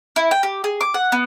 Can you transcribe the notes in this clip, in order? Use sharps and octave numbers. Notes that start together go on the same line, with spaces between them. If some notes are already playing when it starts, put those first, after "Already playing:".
E4
G5
G4
G#4
D6
F#5
B3